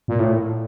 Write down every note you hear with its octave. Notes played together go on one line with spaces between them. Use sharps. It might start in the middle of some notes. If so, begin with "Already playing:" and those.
A#2
A2